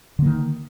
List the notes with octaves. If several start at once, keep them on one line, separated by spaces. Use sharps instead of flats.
D3 D#3 A#3